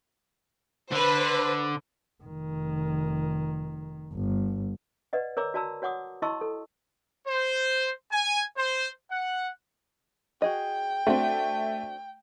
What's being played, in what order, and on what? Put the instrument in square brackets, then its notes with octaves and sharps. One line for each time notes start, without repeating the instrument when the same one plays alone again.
[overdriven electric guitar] D3 [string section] B4 C5
[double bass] F1 D#3
G1
[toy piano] B4 D5 D#5 F#5
A#4 C#5 A#5 D6 E6
F#4 D5 A5 A#5 E6
F#4 C#5 F#5 D6 D#6
E4 D#5 A5 C6 C#6 E6
A4
[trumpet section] C5
G#5
C5
F#5
[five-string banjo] F#4 G#4 D#5 [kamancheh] G5
[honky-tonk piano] A3 [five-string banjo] C4 D4 F#4